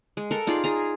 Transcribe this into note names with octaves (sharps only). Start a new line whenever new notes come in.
G#3
A4 A#4 F#5
D#4 F4 G#4 D5
G#4 A#5